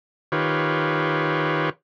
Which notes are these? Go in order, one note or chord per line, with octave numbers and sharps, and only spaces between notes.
D#3 F4 G4 B4 C#5